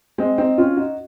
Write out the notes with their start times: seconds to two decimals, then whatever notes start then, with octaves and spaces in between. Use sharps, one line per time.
0.18 G#3 C4
0.38 C4 D#4
0.58 C#4 F4
0.76 D#4 F#4